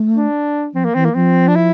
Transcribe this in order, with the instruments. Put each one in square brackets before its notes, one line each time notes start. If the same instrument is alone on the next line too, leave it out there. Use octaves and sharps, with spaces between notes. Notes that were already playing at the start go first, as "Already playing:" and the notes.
Already playing: [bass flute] A3
[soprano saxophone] D4
[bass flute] F3 [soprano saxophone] C4
[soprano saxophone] A#3
[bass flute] E3 [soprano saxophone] C4
[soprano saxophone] A#3
[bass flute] F3 [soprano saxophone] C4
[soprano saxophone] D4
E4